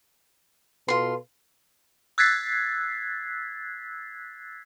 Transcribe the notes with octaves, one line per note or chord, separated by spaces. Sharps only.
B2 F4 A4 B4 C6
E6 F#6 G#6 A6 B6 C7